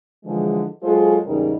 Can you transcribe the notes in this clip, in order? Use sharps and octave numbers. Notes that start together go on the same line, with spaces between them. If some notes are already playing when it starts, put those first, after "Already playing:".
D3 E3 F3 G#3
F#3 G#3 F4 G#4 A4 C5
E2 G#2 C#3 G3 D#4 A#4